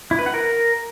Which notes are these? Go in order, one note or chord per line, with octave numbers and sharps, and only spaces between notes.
E4
B4
F#5
A#4